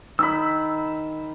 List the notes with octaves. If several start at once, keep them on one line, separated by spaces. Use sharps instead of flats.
D#3 B5 E6